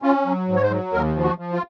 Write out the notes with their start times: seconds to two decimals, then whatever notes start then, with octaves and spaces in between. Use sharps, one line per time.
0.02 C#4 F4
0.26 F#3
0.48 G#2
0.56 C#5
0.63 C5
0.70 F#3
0.93 D#2 A#4
1.16 F3
1.23 F#4
1.38 F3
1.53 F4